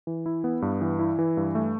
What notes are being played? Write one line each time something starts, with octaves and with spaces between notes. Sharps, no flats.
E3
E4
B3
G2
E3
E4
E3
G2
A3